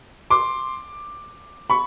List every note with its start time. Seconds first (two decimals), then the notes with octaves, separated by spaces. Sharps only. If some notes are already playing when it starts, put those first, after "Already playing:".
0.30 C6 D6
1.70 B5 C#6